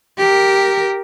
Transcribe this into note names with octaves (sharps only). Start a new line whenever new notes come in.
G4 A#4